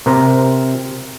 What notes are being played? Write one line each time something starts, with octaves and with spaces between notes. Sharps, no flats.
C3 A#4 C5 A#5